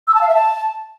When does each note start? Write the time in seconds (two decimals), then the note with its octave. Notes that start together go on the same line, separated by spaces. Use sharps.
0.08 E6
0.14 A5
0.21 F5
0.28 E5
0.35 A5